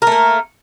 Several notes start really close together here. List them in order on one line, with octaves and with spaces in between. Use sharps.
A#4 A3 A#3